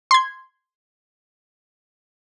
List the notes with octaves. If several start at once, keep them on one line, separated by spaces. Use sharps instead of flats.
C6 G#6